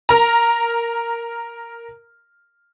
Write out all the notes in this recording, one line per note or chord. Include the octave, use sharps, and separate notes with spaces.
A#4 A#5